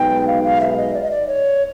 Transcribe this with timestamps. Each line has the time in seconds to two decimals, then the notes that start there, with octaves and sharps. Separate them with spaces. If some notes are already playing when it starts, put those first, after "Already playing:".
Already playing: B1 B2 G#3 B3 D#4 G5
0.27 F5
0.44 F5
0.61 E5
0.77 D#5
0.94 D5
1.03 D#5
1.11 D5
1.27 C#5